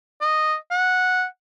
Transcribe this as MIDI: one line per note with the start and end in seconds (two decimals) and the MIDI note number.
0.21 0.55 75
0.71 1.24 78